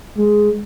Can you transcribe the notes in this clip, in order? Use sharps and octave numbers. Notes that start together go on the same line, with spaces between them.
G#3